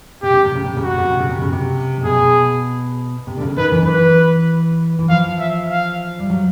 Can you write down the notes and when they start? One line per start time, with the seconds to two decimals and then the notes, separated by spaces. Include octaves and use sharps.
0.23 C3 G4
0.34 C#3
0.44 C3
0.55 C#3
0.66 C3
0.77 C#3
0.83 C3 F#4
0.98 C#3
1.10 C3
1.20 C#3
1.31 C3
1.42 C#3
1.52 C3
2.01 C3
2.05 B2 G#4
3.27 C3
3.37 D3
3.41 C#3
3.57 D#3 B4
3.72 E3
3.83 D#3
3.87 E3 B4
4.99 E3
5.09 F3 F5
5.39 E5
5.70 F5
6.20 G3
6.30 F#3